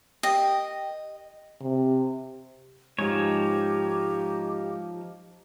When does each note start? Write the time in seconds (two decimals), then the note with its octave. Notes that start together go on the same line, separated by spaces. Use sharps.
0.23 G4 A#4 D#5 G5
1.61 C3
2.99 G#2 F3 D#4 G4 C#5